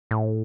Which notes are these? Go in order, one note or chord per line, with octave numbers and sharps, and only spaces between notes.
A2